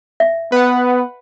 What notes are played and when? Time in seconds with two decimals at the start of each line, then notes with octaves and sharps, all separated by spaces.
0.20 E5
0.52 B3 B4 F#5